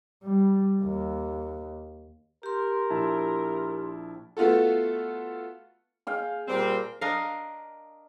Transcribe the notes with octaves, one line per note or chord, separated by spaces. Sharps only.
G3
D#2
G4 A#4 C6
A#1 E4 A5
A3 B3 F4 F#4 A4
G#4 F5 G5
A#2 G3 C4 A#4
D4 A#4 D#5 F5